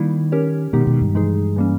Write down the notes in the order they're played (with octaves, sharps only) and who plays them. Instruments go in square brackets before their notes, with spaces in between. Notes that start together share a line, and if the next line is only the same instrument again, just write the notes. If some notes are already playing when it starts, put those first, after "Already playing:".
Already playing: [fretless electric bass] D#3 [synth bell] G3 A#3 E4
[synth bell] C#4 G4 A#4 C#5
[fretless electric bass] B2 [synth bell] D#3 G#3 B3 D#4 G4
[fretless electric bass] B2
G2
[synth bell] E3 G#3 D#4 G#4
E3 G3 A#3 C#4